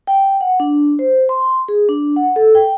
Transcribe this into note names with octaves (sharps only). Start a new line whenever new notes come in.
G5
F#5
D4
C5
C6
G#4
D4
F#5
A4
G5